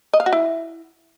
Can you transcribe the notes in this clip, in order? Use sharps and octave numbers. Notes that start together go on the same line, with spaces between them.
D#5
F5
F#4
E4